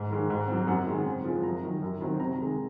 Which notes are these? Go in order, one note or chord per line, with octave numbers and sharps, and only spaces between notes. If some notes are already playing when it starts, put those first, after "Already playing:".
Already playing: G#2
D#3 G#3
G#2
F#3 C4
F#2 F#5
D#3 G#3 C4
C#3
F3 G#3 C4
F#2 A#5
D#3 F#3
F#2
D#3 F#3 C4
C3 A#5
D#3 G#3